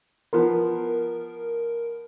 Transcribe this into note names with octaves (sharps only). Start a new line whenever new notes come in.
F3 B3 A#4 C6